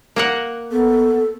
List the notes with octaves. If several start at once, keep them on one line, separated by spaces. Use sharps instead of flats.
A#3 A#4 F#5
B3 A4